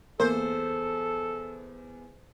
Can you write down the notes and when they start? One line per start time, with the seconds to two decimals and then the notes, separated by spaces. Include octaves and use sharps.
0.20 E2 A#3 A4 C5